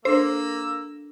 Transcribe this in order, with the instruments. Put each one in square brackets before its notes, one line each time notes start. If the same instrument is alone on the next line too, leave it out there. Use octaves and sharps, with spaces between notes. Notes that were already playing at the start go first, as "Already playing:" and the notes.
[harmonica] A#3 E6 [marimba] D4 A4 [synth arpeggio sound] C5